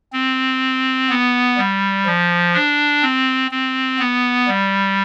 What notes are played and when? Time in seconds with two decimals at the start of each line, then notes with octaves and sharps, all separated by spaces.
0.13 C4
1.09 B3
1.57 G3
2.06 F3
2.54 D4
3.02 C4
3.51 C4
3.99 B3
4.48 G3